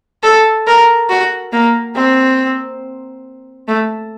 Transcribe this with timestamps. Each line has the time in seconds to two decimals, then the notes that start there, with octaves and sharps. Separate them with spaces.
0.23 A4
0.67 A#4
1.10 F#4
1.53 A#3
1.96 C4
3.68 A3